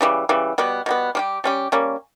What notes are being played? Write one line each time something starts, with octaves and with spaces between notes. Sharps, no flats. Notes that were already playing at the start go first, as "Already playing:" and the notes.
C#3 E3 G3
C#3 E3 G3
B2 G3 B3
B2 G3 B3
G3 C#4 G4
G3 C#4 G4
G3 A#3 C#4